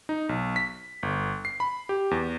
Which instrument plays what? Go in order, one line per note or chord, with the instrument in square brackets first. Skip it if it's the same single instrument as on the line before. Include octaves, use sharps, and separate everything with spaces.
[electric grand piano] D#4
B1
B6
G1
C7
B5
G4
E2